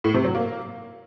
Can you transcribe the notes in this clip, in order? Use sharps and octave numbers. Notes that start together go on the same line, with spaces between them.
A2
C3
F#3
A#3